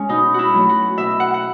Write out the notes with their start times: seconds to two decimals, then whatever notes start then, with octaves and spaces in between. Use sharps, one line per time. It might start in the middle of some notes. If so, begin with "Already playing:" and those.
Already playing: G#3 C#4
0.09 B2 D#4
0.34 E4 F#4
0.54 F#3 A3
0.69 F#4
0.98 B2 E5
1.20 F#5
1.34 F#5